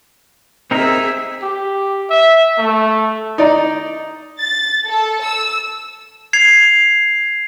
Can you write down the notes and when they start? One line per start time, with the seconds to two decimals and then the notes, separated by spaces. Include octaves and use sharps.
0.71 C4 D#4 G#4 A#4 E5
1.42 G4
2.10 E5
2.58 A3
3.38 D#4 D5 A#5
4.40 A6
4.87 A4
5.23 E6
6.33 G#6 C7 F7